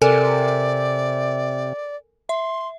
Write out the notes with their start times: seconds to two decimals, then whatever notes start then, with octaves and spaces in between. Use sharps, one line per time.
0.02 C3 A4 A#4 D5 G#5
2.29 E5 C6